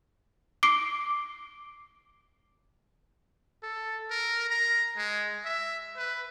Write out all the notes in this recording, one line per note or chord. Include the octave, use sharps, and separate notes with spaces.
D6 C7 D7
A4
A#4
A#5
G#3
E5
B4